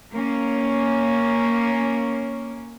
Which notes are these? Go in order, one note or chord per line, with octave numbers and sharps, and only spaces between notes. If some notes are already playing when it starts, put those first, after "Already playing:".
A#3 C#4